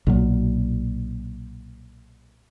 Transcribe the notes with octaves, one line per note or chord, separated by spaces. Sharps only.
B1 A#2 F#3